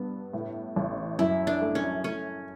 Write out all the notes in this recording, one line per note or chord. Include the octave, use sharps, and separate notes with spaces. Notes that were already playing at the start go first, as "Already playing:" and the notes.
Already playing: G2 B3
A2
A1
F#2 E4
D4
A3
C#4
A3 C#4